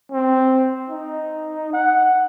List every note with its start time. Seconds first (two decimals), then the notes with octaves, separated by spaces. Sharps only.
0.12 C4
0.90 D#4
1.73 F#5